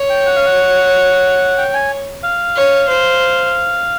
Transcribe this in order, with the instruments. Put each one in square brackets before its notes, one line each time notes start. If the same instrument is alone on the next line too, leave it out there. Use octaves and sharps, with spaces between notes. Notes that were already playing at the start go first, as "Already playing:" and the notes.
Already playing: [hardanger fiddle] C#5
[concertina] G5
F#5
F5
F#5
G5
G#5
F5
[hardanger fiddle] C#5
C5